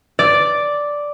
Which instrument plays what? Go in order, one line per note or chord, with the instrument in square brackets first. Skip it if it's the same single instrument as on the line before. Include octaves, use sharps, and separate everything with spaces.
[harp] D5